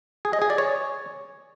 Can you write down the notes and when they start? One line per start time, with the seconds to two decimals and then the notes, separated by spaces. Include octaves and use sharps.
0.25 G#4
0.33 D#5
0.42 G#4
0.50 D5
0.58 C#5